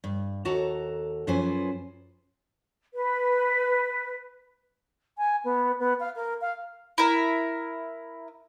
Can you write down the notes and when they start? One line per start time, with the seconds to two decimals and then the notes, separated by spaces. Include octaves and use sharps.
0.04 G2
0.45 D#2 F#4 A4 A#5
1.27 F#2 F3 C#4 B4 C5 G#5
2.94 B4
5.17 G#5
5.44 B3
5.79 B3
6.00 F5
6.16 A#4
6.41 F5
6.98 E4 A#4